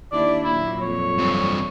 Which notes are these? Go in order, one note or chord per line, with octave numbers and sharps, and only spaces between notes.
D#2 D4 E4 D5
A#2 F#3 E4
F2 C#5
G2 C4